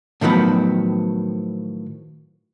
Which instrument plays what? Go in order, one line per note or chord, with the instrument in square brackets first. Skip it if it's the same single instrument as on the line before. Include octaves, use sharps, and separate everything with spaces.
[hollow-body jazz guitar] A2 D#3 F3 F#3 B3